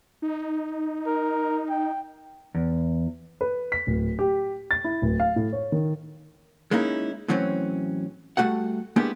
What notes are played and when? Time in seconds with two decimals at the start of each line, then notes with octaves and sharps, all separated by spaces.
0.22 D#4
1.07 A#4
1.70 G5
2.55 E2
3.41 B4
3.72 B6
3.87 D1
4.19 G4
4.71 A6
4.84 E4
5.02 D1
5.20 F5
5.36 A2
5.53 C#5
5.72 D#3
6.71 G#3 A#3 C#4 D#4 E4
7.28 A2 E3 F#3 C4 C#4
8.37 G3 A3 F#4 A4 F#5
8.96 G#3 A#3 B3 D4 E4 G4